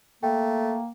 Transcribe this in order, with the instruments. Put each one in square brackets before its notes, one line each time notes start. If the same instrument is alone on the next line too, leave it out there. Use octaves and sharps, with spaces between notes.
[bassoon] A3 [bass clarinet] A#3 [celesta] G5